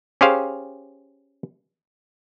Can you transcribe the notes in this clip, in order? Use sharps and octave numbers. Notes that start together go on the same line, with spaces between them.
C#4 G4 G#4 C5 F5